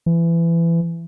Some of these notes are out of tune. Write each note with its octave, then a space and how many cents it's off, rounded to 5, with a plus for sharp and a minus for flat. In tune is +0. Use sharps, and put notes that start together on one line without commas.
E3 +25